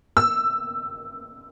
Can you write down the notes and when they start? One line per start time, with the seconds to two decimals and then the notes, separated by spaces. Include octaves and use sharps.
0.17 E6